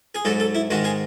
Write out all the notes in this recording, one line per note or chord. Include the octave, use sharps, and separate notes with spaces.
G#4
G#2 F#3 A4
A4
E4
G#2 D#3 G#3 F#4
G#4